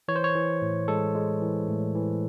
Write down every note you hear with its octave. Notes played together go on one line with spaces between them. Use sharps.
E3 C#5
C5
C#5
E3
A2
G#3 A4
G#3
E3
A2
E3